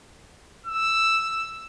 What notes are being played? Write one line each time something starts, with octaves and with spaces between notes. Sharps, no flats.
E6